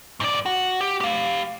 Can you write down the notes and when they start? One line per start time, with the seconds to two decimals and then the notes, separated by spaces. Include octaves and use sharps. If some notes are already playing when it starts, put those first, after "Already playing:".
0.20 G#2 D5
0.46 F#4
0.81 G4
1.01 G4 F5